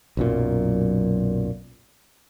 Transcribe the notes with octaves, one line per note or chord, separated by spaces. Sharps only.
B1 F#2 A#2